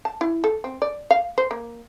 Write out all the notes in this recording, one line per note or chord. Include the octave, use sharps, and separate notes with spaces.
A5
E4
A4
C4
D5
F5
C5
A#3